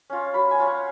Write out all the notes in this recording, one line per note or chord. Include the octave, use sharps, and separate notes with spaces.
C#4 F4
F#3 B5
G#5
C#4 F4
F#5